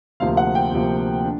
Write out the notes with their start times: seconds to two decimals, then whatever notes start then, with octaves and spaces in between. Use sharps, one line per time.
0.20 D2 C3 F3 A#3 F5
0.37 F#5
0.55 G5
0.72 D2 C3 F3 A#3
1.24 D4